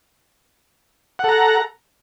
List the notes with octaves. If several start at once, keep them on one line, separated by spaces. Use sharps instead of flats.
A4 F#5 A#5